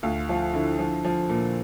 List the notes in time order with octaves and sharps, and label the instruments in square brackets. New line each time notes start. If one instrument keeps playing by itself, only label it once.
[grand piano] D2 F4
F3 F4
D3 E4
F3
F3
A#2